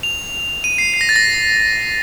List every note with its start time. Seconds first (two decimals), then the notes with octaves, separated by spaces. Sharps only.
0.03 F7
0.64 D#7
0.78 C7
0.94 C7
1.01 A#6
1.09 A6
1.16 A#6